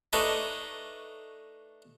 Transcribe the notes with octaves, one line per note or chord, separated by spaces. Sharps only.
A3 D4 D#4 B4 C#5 D#5